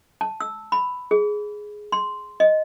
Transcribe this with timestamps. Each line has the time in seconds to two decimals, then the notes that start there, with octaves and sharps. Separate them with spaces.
0.21 A5
0.40 E6
0.72 B5
1.11 G#4
1.92 C6
2.40 D#5